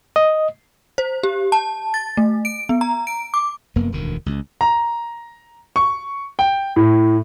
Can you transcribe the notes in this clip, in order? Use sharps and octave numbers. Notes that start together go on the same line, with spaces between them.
D#5
C5
G4
A5
A6
A3
D7
B3
A#5
D7
D6
F1 F#2 A#3 B3
E1 D2 D#3
C#2
A#5
C#6
G5
A2